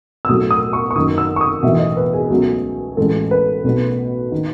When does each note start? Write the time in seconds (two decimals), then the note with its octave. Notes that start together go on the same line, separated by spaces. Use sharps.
0.25 E6
0.29 B1 A2 F#3 A3 D#6
0.51 D#6
0.73 C#6
0.91 C#6
0.96 F#1 F#2 D#3 D#6
1.18 E6
1.36 C#6
1.41 D#6
1.63 B1 A2 E3 E5
1.79 D#5
1.97 B4
2.13 G#4
2.30 C#2 B2 F#3 A3
2.97 A1 A2 E3 G#3 A4
3.31 B4
3.64 B1 B2 A3
4.32 D#3